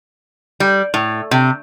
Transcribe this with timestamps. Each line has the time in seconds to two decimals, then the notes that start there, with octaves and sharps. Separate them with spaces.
0.60 G3
0.94 A2
1.31 C3